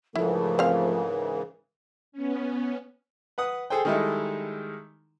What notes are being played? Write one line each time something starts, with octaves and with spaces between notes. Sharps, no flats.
G#2 C#3 E3 F3 A3 E4 A#4
C4 F5
B3 C#4
B4 F#5 D#6
G#4 A4 C5 G5
D#3 G3 G#3 D#4 E4 A4